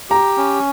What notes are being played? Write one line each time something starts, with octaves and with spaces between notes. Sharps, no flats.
G4 A#5
C#4